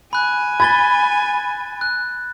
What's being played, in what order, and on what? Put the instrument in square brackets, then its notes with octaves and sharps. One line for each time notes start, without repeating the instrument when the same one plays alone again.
[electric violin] G#5 [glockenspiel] B5 F#6
[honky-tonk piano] B5 [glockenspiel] G#6 A6 G7
[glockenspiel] F#6